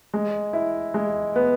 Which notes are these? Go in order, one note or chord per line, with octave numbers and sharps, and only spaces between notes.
G#3
E4
G#3
B3